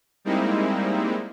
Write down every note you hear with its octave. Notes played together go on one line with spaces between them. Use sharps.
G3 G#3 A#3 C4 D#4 E4